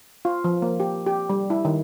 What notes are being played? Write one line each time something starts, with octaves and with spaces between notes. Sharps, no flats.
F4
F3
A#3
G4
G4
G3
E4
D#3